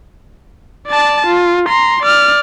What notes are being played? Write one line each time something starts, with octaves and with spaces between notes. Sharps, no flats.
D5 A5
F4
A#5 C6
D5 F6